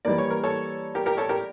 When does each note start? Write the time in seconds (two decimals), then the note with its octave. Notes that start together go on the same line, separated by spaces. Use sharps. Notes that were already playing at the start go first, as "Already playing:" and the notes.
0.05 E3 G3 A#3 D5
0.18 C#5
0.30 A#4
0.44 A4 C#5
0.95 G4 A#4
1.06 G4 A#4
1.17 A4 C#5
1.29 G4 A#4